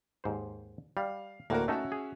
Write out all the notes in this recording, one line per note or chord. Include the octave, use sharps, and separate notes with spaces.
D#2 G#2 C5
G3 F5
D2 A2 A#3 F#4 A#4
A3 C#4 D#4 F#4 A4 E5
G#4